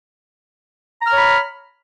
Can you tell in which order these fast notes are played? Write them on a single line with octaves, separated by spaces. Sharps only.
A#5 F6 C#5 B5